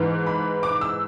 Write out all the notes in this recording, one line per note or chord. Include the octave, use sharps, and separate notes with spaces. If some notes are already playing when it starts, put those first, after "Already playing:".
Already playing: G#2 E3
B5
D6
E6